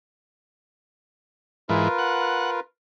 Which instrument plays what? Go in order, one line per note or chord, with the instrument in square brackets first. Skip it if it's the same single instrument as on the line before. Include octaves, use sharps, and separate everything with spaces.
[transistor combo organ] G#2 E3 [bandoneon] F4 A#4 B4
[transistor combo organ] F#5